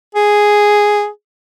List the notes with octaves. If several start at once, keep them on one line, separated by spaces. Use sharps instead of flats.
G#4